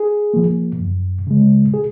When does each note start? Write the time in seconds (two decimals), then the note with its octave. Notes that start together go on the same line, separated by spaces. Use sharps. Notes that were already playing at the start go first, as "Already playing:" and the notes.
Already playing: G#4
0.34 F3 A#3
0.80 F#2
1.27 C#3 G#3
1.74 G#4